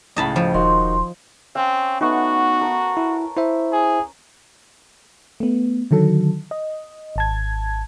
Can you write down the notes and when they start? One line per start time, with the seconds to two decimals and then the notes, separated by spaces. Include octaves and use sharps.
0.16 C#2 A2 C#3 D#5 A5 B5
0.36 F3
0.54 E1 D#3 D#4 F#4 C6
1.55 C4 C#4 F5
2.01 A3 B3 D#4 F#4 C#6
2.61 A#4 A5
2.97 E4
3.37 E4 C5 E5
3.72 G#4
5.40 A3 B3
5.91 D3 D#3 F#3 A4
6.51 D#5
7.16 G#1 A5 G#6